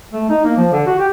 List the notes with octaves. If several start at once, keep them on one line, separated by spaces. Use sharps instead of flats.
A3
D#4
A#3
F3
D3
F#4
G4